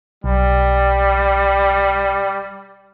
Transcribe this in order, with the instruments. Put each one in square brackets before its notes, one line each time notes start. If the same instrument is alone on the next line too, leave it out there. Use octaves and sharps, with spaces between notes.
[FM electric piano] B1 [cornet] G3